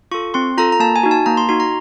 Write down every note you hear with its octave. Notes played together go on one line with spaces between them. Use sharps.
F4 A4 C#6
C4 C6
F4 A4 A#5
A#5
A#3 A5
G#5
D#4 F#4
A5
A#3 A#5
C6
D#4 F#4 C6
A#5